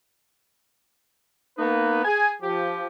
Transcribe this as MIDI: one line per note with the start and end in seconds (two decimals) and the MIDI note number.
1.57 2.01 58
1.57 2.01 59
1.57 2.01 63
1.57 2.01 71
2.04 2.31 68
2.04 2.31 80
2.42 2.87 53
2.42 2.87 67